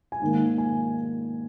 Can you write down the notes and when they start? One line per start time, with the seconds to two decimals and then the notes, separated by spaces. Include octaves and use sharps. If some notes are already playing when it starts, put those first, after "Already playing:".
0.12 G#5
0.21 G#2 D#3 A#3
0.58 G#5